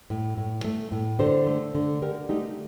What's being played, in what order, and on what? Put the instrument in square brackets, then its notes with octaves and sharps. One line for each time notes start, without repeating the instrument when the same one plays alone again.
[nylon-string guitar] A2
A2
A3
A2
D3 A4 C5
A3
D3
D3 G4 A#4
A3 D#4 G4